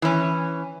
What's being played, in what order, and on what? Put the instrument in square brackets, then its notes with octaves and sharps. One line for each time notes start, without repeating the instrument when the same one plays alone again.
[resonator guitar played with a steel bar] E3 C#4